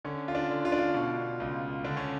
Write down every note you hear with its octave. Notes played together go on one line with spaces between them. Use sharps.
D3 C#4
F4
D4
D3
F4
D4
F4
B2
C#2
D3 D4
C#4